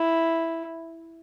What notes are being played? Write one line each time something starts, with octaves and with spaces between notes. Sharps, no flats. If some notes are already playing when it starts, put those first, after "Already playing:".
Already playing: E4